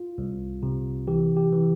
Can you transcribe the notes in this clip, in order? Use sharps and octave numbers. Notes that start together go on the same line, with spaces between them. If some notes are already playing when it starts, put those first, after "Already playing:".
Already playing: F4
C2
C3
E3 G4
G4
E3